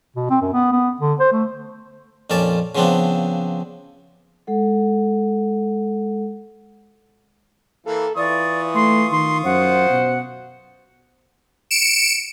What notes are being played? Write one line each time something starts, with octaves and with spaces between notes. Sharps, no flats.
B2
C4
F#2
B3
B3
D3
C5
A3
F2 A#2 C#4 D5 A5
C#3 F3 B3 C4 D4
G#3 A4 F#5
E3 A#3 A4
E3 F4 D5 C#6 D#6
A3 C6
D#3 C6
F#2 C5 F#5
B2
C#7 D7 E7